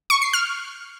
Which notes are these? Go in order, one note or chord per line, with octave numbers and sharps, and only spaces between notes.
C#6
C7
F6